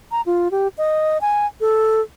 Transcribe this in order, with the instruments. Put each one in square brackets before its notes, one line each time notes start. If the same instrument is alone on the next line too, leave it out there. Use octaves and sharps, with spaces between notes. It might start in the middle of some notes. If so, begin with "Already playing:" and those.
[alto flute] A#5
F4
G4
D#5
G#5
A4